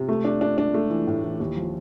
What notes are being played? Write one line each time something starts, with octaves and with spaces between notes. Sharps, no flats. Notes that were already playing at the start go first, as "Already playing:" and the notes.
Already playing: C3
A3
D4
D4
D4
A3
E3
A2
E3
D#2
F3